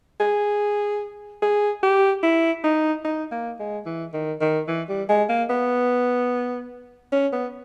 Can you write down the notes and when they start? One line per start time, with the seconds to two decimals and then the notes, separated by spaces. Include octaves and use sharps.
0.20 G#4
1.42 G#4
1.83 G4
2.23 E4
2.64 D#4
3.05 D#4
3.32 A#3
3.59 G#3
3.86 E3
4.13 D#3
4.41 D#3
4.68 E3
4.89 G3
5.09 G#3
5.29 A#3
5.50 B3
7.12 C#4
7.32 B3